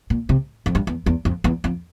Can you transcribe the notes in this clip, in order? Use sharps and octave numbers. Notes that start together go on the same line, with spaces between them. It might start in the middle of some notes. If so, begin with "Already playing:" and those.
A#2
C3
F2
G2
E2
E2
F2
E2
F2